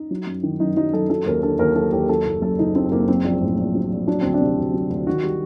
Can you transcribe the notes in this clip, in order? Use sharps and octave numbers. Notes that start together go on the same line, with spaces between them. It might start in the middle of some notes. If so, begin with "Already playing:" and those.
Already playing: D#4
F#3
F#2
D#3
F#2 D#4
F#3 D#4
F#2 A4
F#3 A4
D#2 A#4
D3 A4
D#2 A#4
F#3 A4
D#2 G4
A#4
F#3 A4
F#1
F#2 A4
F#1 D#4
F#3 C4
F#1 A#3
F#3 C4
A#1
A2
A#1
F#3
A#1
F#3 D4
D2 C4
D4
C3
D2
F#3
D2
D#3 F#4
G3